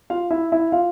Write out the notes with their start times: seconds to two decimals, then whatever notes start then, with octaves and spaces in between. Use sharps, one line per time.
0.10 F4 F5
0.31 E4 E5
0.52 E4 E5
0.72 F4 F5